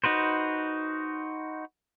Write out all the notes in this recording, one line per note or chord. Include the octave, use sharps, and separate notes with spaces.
D#4 F#4 B4 C5